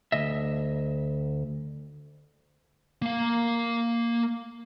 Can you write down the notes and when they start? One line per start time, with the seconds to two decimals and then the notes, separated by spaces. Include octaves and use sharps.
0.12 D2 D#5 E5
3.02 A#3 F5